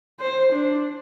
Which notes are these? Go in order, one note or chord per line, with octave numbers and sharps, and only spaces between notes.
C5
D4